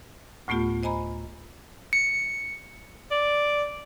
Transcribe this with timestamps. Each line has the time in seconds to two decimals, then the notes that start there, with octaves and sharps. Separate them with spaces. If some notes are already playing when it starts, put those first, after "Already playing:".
0.48 D2 A2 A3 B3 F4 G4
0.83 C5 D#5 G#5 A#5 B5
1.93 C#7
3.11 D5